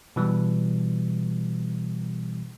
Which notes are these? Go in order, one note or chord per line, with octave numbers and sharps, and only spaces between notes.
B2 E3 G3